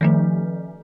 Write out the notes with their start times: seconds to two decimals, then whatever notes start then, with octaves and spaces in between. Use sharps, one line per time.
0.01 D#3 F3 A3